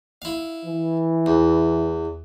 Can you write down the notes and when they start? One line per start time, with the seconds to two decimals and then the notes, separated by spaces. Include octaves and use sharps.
0.22 E4 F5
0.65 E3
1.26 E2